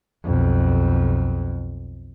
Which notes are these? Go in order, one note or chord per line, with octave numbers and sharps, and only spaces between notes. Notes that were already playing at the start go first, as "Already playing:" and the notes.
B1 F2